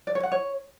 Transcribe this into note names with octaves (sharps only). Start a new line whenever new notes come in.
D5
C#5
F#5
C#5